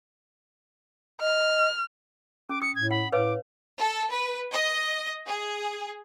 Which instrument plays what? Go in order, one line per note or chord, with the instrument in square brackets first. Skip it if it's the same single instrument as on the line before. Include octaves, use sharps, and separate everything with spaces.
[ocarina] D#5 [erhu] F6
[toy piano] C#4 [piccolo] D6
[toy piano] D#6 [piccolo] C#7
[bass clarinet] A2 [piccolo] G#6
[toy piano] F#5 [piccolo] B5
[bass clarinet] A2 [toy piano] B4 C#5 F5 [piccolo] D6
[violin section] A4
B4
D#5
G#4